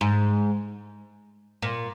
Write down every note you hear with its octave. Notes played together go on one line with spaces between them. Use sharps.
G#2
A#2